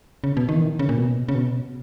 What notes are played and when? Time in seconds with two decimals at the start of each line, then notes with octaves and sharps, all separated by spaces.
0.24 C#3
0.37 B2
0.49 D#3
0.55 E3
0.62 D#3
0.79 C#3
0.89 A#2
0.98 B2
1.28 C#3
1.35 B2